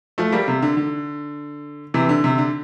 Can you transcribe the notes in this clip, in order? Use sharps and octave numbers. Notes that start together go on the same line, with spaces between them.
F3 A3
G3 A#3
C3
D3
D3
C3 E3
D3
C3
D3